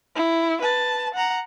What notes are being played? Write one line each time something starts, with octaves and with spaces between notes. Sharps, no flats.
E4
B4 A5
F#5 A#5